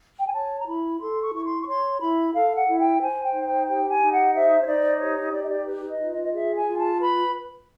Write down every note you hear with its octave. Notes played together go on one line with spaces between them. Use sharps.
G5
G#5
C#5 A5
A#5
E4 B5
A4 C6
C#6
E4 C#6
C6
C#6
C#5 C6
E4 B5
A4 F5
F#5
E4
G5
C5 G#5
G5
D#4
G5
G4 G5
G#5
D#4
F#5
C5 E5
C#5
D#4 D5
G4 C#5
D#4 D5
D#5
D5
B4
D#5
F4
D#5
D#5
G#4 E5
G#5
F4
A5
B4 B5